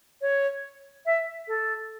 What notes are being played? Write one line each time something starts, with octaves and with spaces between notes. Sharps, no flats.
C#5
E5
A4